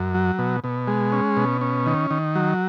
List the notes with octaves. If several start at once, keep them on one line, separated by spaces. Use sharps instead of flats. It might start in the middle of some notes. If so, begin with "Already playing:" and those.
Already playing: F#2
F#3
B2
B2
G#3
C#4
B2
C#4
D#3
D#3
F#3